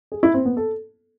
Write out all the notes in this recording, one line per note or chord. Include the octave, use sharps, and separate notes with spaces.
G#4
E4
C4
B3
A4